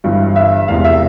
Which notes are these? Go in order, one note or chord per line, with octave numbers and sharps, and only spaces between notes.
G1 G2 E3
E5
E1 E2 C3 F5
E5